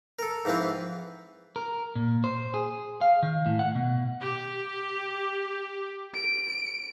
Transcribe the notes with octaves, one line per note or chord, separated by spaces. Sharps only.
A4 A#4
G#2 E3 F3 C4 B4
A#4
A#2
C5
G#4
F5
D#3
A2
F#5
B2
G4
D7